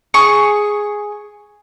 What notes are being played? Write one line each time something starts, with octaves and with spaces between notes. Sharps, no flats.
G#4 C#6